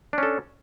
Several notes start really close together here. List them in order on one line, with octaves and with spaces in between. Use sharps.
D4 C#4 A4